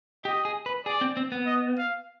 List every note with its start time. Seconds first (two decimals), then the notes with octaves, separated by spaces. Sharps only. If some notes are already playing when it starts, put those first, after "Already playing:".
0.25 G4 D#5
0.45 G#4
0.66 B4
0.86 G#4 D5
1.01 C4
1.17 C4
1.32 B3
1.46 D#5
1.78 F5